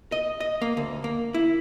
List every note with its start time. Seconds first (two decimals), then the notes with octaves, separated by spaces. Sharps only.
0.12 D#5
0.40 D#5
0.62 A#3
0.77 D2
1.04 A#3
1.34 E4